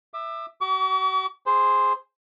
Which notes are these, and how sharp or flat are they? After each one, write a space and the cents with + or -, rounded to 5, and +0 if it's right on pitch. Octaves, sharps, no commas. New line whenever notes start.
E5 +0 D6 +35
F#4 +40 D6 -45
G#4 -10 C5 +0